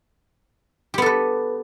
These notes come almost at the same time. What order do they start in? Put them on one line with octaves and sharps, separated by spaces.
G4 B3 A4 B4